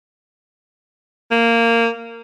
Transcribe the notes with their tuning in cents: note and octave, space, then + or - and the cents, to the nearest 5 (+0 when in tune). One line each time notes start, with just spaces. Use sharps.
A#3 -15